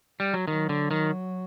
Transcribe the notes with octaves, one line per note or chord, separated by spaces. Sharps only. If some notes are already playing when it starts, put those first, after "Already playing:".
G3
F#3
D#3 F#3
D3
D#3